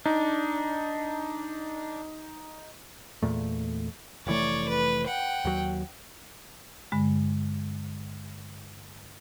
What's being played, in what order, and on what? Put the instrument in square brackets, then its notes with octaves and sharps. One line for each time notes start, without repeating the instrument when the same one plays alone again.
[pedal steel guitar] D4 [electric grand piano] D#4
[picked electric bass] E2 A#2 A3
[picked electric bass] F1 E3 A3 [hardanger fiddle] C#5 D5
[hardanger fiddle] B4
F#5 G5
[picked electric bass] D#2 F#3
[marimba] G2 D3 G#3